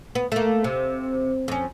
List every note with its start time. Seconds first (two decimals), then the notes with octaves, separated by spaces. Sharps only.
0.15 B3
0.32 A3 A#3
0.64 C3
1.48 F2 C#4